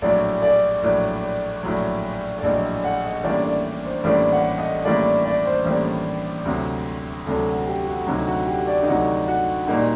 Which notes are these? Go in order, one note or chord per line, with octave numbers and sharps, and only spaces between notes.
A#1 A2 F#3 D5
D5
A#1 A2 F#3
A#1 A2 F#3
D5
A#1 A2 F#3 D#5
F#5
D#5
A1 A2 G3 A#3 D4 D5
D5
C5
A1 A2 G3 A#3 D4 D5
F#5
D#5
A1 A2 G3 A#3 D4 D5
D5
C5
A1 A2 G3 A#3 D4
D2 C3 F#3
D2 C3 F#3 A4
F#4
G4
F#4
D2 C3 F#3 D#4
F#4
G4
D5
D#4
D2 C3 F#3 F#4
F#4
A#2 G3 A#3 D#4 F#4